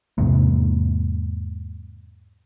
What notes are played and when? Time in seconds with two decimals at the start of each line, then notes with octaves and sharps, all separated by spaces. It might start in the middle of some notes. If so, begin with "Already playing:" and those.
0.18 E2 G#2 C3 A#3